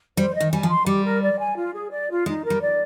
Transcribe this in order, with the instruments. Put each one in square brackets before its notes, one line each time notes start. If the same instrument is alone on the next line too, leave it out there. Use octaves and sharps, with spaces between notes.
[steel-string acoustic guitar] G3 [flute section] C5
[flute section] D#5
[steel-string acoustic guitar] D#3
[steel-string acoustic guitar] G3 [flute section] G#5
[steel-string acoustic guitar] F3
[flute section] C6
[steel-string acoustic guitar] G3 [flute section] G4
[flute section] A#4
D5
G#5
F4
G#4
D5
F4
[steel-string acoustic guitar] G#3 [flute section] D#4
[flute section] A#4
[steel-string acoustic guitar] G3
[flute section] D5